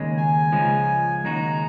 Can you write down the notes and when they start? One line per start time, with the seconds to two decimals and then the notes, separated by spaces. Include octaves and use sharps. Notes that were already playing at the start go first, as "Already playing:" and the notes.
Already playing: D#2 C#3 G#3
0.17 G#5
0.52 C#2 C#3 F3 G#3
1.25 D#2 C#3 G#3 D#4 F#4 A#5